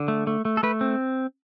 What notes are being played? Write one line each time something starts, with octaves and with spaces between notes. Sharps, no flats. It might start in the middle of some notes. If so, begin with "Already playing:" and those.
Already playing: D3
A3
A3
A3
A4
A3 B4
C4